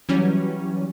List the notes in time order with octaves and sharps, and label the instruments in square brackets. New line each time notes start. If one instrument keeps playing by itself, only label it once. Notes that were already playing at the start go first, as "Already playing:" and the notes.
[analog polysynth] E3 F#3 G3 C#4